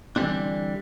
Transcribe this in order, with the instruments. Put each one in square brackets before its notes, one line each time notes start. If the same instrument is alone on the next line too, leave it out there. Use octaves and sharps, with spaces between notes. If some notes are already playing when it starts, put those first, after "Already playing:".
[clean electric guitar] D3 E3 F3 G3 C4 D4